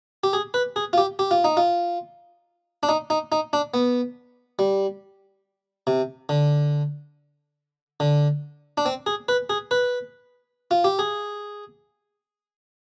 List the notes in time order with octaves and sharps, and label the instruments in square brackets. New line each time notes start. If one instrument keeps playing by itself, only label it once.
[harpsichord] G4
G#4
B4
G#4
F4
G4
G4
F4
D#4
F4
D4
D#4
D#4
D#4
D4
B3
G3
C3
D3
D3
D4
C4
G#4
B4
G#4
B4
F4
G4
G#4